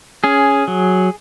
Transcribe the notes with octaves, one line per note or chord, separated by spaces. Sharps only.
C#4 G#4
F#3